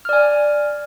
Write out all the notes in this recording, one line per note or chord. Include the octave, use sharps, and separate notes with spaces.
D5 G#5 F6